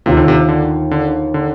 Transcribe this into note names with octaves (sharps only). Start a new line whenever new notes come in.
D#2 C3 D#3 A#3 F4
D3
C3
D3
D3
D3